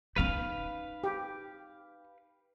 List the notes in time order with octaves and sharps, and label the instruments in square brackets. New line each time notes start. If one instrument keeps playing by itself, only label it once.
[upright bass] C#4 D#4 [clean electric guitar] B4 F5
[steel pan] G4